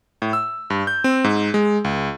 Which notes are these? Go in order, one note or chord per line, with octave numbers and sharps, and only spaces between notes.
A2
E6
G2
G6
C4
G#2
G#3
C#2